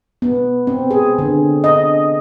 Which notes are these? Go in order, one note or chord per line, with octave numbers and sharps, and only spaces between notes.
B3
C4
G#4
D3
D#5